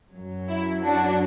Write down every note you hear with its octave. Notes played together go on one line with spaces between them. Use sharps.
F#2 F#3
E4
D4 F#4